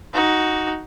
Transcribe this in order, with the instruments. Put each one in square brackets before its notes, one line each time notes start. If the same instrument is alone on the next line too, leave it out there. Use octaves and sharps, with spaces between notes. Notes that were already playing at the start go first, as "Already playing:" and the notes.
[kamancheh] D#4 F#4